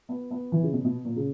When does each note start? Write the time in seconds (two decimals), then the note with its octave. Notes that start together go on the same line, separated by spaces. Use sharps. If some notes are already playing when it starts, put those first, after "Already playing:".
0.09 B3
0.31 B3
0.52 E3
0.63 C#3
0.73 B2
0.85 B2
1.05 A#2
1.16 C#3